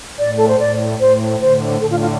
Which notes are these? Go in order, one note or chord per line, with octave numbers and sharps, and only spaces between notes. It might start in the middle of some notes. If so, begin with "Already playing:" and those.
A2 D5
A4
C5
A2 D5
A2 C5
A2 D3 C5
A2 D3 A4
F4
F4